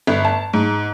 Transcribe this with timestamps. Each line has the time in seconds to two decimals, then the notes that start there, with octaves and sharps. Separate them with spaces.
0.07 G1
0.25 A5
0.53 G#2